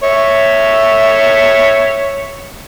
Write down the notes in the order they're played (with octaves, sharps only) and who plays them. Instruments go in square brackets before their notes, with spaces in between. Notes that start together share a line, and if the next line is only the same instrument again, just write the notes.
[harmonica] C#5 E5